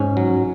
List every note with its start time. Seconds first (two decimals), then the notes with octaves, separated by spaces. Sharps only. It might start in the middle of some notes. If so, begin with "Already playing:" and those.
Already playing: G#2 C#4
0.17 F#3